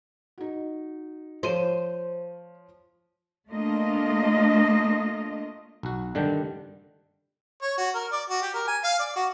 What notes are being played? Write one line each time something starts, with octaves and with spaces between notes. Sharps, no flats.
D#4 F#4
F3 C5 C#5 D#7
A3 A#3 D4 F4 D#5
B1 F#4
G2 D3 D#3 G3 D4 G5
C#5
F#4
A#4
D5
F#4
G4
A#4
G#5
F5
D5
F#4